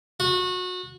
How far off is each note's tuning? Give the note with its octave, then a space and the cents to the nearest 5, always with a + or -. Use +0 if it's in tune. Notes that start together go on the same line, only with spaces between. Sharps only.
F#4 -25